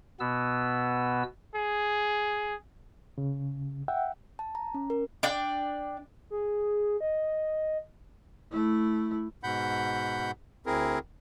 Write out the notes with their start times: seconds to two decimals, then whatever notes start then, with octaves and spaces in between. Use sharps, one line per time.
0.20 B2 B3 E6
1.55 G#4
3.18 C#3
3.88 E5 F#5 G5
4.39 A5
4.55 A#5
4.74 C#4
4.90 A#4
5.23 D4 D5 G5
6.30 G#4
7.01 D#5
8.51 A3 E4
9.44 G#2 B2 F#5 B5 G6
10.66 D2 C4 E4 G#4 A#4